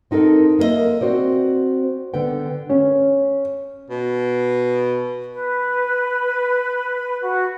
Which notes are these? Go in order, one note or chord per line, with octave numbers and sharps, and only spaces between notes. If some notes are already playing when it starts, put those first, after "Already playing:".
C4 D#4 F#4 A4 A#4
A#3 A#4 B4 D#5 E5
C4 F#4 C5 D5
D3 B3 G5
C#4
B2
B4
F#4